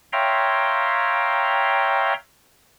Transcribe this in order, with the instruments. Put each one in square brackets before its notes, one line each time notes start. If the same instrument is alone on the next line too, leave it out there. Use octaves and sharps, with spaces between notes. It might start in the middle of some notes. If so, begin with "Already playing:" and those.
[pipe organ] C#5 E5 F5 G5 A#5 C6